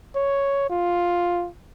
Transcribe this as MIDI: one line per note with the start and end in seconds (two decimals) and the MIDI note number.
0.15 0.67 73
0.70 1.48 65